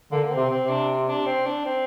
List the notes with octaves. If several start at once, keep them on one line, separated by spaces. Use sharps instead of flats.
D3 A#3
A#3
C4
C3
C4
C3
D4
D4
C4
D4
C4